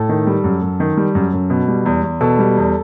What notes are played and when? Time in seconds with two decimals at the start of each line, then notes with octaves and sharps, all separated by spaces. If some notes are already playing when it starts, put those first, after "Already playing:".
Already playing: A2 A4
0.09 D#3
0.27 G3
0.44 F#2
0.62 F#2
0.80 D#3
0.97 G3
1.15 F#2
1.33 F#2
1.50 B2
1.68 G3
1.86 E2
2.03 E2
2.21 B2 A4
2.39 G3
2.57 E2